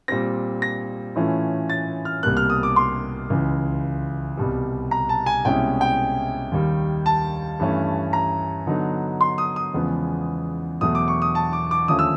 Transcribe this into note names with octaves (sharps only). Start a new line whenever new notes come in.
A#2 G3 C4 A#6
A#6
A2 E3 A3 C#4 F4
A6
F6
C2 B2 G3 A#3 F#6
F6
D#6
D6
C6
C#2 C#3 E3
C2 B2 G3
A#5
A5
G#5
C2 B2 G#3 C#4 E4 G5
G5
D#2 D#3 G3
A5
G2 E3 A3 C#4
A#5
D3 F#3 B3 D#4
C6
D#6
D#6
E2 C#3 F3 G#3 B3
E2 B2 F#3 A3 D#6
D6
C#6
D#6
A5
D6
D6
D#2 D3 F3 A3 C#4 D#6
E6